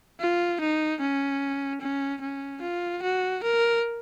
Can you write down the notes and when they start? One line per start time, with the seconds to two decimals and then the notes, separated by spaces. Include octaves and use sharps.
0.20 F4
0.61 D#4
1.00 C#4
1.81 C#4
2.21 C#4
2.61 F4
3.02 F#4
3.43 A#4